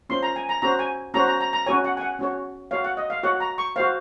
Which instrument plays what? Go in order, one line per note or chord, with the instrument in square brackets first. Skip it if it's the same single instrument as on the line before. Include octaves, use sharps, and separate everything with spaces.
[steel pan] C#4 F4 C5 C6
A#5
G#5
A#5
C#4 F#4 C5 A#5
G#5
C#4 F#4 C5 A#5
A#5
A#5
A#5
C#4 F#4 C#5 G#5
F#5
G#5
F#5
C#4 F#4 C#5
F#4 C#5 F5
F#5
D#5
F5
F#4 C#5 F#5
A#5
C#6
F#4 C5 F5